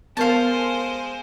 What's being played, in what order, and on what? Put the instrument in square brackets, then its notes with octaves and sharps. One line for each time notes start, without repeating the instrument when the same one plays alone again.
[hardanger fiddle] G#3 C5 [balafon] B3 A#4 [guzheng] F5 A5